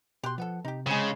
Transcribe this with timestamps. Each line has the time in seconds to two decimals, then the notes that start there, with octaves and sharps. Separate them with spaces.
0.23 B2 G4 C6 F#6
0.38 F3 B3 A4 F#5
0.65 C3 D#4 G4
0.86 C#3 G#3 C4 G#4